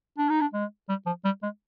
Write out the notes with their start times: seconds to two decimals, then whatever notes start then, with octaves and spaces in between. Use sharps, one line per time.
0.18 D4
0.29 D#4
0.41 D4
0.54 G#3
0.89 G3
1.06 F3
1.25 G3
1.43 G#3